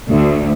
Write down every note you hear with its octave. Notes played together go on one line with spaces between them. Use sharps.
D2